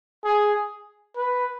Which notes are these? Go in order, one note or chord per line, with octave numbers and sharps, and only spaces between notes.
G#4
B4